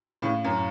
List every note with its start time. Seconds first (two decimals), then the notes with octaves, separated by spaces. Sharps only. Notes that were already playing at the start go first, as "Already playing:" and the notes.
0.22 A2 C#3
0.44 F#2